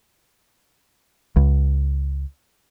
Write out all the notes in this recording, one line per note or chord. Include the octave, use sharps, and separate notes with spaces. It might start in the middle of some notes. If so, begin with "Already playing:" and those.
C#2